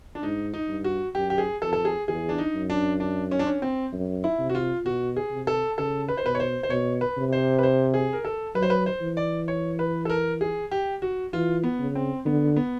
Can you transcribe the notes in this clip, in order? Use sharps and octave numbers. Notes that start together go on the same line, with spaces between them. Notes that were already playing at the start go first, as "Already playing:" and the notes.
D4
G#2 D#4
D#4
G2
F#4
F#2 G4
G4
G#4
F2 A4
A4
G#4
E2 G#4
D4
D#4
F#2
D4
D4
C#4
D4
C#4
C4
F#2
E4
C3
F#4
F4
B2 F#4
G#4
C3
A4
C#3 A4
B4
C5
B2 B4
C#5
C5
C5
B2 C#5
B4
C3
C5
B4
C5
G#4
A#4
A4
F#3 B4
C5
B4
C5
E3
D5
C#5
B4
A4
A#4
G#4
G4
F#4
E3 F4
B3
C#3
C4
D3 B3
B3